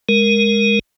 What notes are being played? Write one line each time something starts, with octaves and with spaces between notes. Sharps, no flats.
G#3 A#4